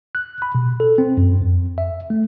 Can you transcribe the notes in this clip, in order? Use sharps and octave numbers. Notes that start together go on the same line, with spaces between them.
F#6
B5
B2
A4
C4
F#2
F2
E5
A3